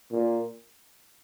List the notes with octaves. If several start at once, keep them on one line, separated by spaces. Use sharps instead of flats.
A#2